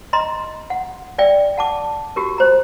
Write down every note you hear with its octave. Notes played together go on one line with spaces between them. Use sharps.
D#5 A#5 C6
F#5
D5 E5 G5
F#5 A5 D6
F#4 G4 A#4
C5 A#5